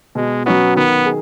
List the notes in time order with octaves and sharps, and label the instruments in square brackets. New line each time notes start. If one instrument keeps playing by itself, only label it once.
[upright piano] B2 [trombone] G#3
[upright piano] F#3 C#4 F#4 [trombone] B3
[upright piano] D#3 [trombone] B3
[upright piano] G#4